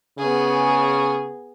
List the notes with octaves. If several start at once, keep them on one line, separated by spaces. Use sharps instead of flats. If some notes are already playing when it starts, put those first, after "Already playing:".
C#3 B3 G#4